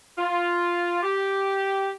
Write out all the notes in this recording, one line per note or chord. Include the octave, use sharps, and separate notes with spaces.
F4
G4